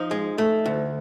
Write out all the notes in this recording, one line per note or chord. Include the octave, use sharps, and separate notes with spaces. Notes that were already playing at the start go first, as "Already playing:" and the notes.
Already playing: F3 D#4
G#3
A3
D2